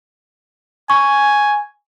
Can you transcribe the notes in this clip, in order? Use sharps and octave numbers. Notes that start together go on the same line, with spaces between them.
G#5 C#6